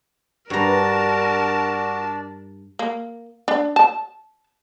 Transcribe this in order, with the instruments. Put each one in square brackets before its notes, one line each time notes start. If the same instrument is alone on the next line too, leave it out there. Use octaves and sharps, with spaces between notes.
[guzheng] G2 A#5 [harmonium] D4 D5 [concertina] F#4 [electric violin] A#4 A5
[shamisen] A#3
D4
A5